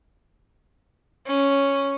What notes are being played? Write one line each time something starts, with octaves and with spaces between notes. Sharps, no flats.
C#4